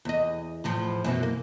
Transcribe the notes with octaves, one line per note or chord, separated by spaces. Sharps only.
E2 D#5
E2 A2 F3
F#2 B2 E3
A#3